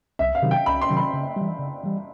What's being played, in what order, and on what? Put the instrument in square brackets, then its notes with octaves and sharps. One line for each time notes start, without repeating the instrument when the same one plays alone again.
[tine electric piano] C2 [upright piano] E5
[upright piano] F5
[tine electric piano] C3 D#3 F#3
[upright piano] G5
[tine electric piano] C2 [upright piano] B5
[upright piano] C6
[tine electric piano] C3 D#3 F#3
[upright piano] B5
[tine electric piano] C#3
E3 G3
C#3
E3 G3